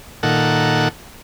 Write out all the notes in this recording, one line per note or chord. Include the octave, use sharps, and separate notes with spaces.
A#2 D#3 A4 F#5